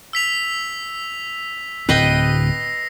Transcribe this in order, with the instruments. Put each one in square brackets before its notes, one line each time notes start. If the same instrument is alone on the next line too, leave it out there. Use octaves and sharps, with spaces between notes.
[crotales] E6 B6 F7
[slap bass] D1 C4 [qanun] B4 D#5 G5 [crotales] A#6 C7